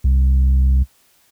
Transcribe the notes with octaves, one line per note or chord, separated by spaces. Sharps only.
C2